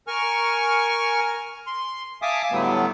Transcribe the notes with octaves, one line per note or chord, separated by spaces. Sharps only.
A#4 G#5 C#6 F6
C6
E5 F5 G#5 A5 D6 D#6
A2 D3 F#3 G3 A3 B3